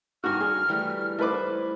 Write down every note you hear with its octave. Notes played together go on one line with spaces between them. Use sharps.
G2 F#4 A#4 G#5 F6
D4 G#4
E3 G3 A3
A3 E4 B4 C5 D6